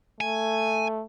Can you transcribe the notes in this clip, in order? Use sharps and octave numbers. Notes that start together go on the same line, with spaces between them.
A3 G#5